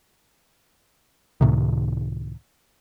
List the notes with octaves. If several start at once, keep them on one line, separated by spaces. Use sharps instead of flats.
C#2 A2 C3 D#3